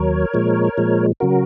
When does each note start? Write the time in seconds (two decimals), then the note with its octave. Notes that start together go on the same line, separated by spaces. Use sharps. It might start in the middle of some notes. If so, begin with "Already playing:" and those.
Already playing: D#2 F#3 A#4 C#5
0.34 A#2 F3 G#3
0.78 A#2 F3 G#3
1.20 C#3 F#3 F#4 A#4